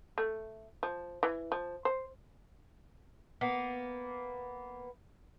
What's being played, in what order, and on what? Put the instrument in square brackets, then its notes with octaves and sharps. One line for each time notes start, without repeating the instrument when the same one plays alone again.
[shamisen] A3
F3
E3
F3
C5
[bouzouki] A#3 B3